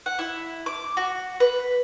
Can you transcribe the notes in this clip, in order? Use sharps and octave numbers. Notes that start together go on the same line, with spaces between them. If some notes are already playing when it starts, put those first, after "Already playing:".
F#5
E4
D6
F#4
B4